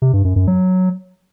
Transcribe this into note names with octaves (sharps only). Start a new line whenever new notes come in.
C3
G2
F#2
F#2
F#3